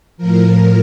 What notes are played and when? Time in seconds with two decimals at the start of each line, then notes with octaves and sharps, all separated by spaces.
0.17 A2 F3 A#4